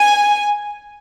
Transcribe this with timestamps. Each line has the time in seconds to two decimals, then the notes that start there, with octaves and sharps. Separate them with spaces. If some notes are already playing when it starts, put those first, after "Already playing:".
Already playing: G#5